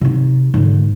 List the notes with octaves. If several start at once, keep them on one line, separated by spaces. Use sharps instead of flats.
C3 D#4
G#2 D3